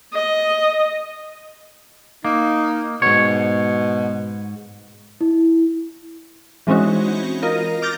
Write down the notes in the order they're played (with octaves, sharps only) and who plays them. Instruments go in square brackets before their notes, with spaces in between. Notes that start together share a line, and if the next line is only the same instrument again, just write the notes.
[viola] D#5
[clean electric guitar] A#3 [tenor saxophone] D#4
[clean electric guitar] G#2 C#5 [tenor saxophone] B2
[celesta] E4
[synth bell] E3 G#3 C4 C#4 D#4 F#4
F4 A#4 D#5
D6 F6 G6 A6 A#6